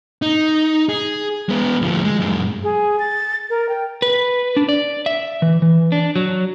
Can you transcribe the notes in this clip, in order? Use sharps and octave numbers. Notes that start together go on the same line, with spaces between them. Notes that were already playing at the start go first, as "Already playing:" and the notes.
D#4
G#4
G#3 B3
D2 F3
G#3
F#2 G#3
G#4
A6
A#4
G5
B4
D4
D5
E5
E3
E3
D4
F#3